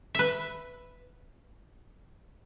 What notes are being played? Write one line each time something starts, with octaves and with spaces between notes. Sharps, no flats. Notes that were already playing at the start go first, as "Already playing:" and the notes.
B4 E5